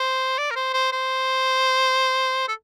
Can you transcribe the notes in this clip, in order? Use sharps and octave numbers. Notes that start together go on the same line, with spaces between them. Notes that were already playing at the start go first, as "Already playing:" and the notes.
Already playing: C5
D5
A#4
C5
C5
C5
A4